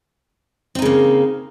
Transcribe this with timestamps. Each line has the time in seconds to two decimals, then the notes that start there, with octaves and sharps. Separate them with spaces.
0.75 C4
0.79 D#4
0.82 C#3
0.85 A#3